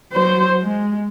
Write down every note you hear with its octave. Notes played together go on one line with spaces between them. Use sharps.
F#3 C5
G#3